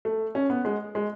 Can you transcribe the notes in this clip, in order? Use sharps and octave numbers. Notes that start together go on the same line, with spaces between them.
A3
C#4
B3
G#3
G#3